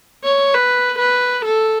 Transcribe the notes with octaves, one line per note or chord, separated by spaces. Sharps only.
C#5
B4
B4
A4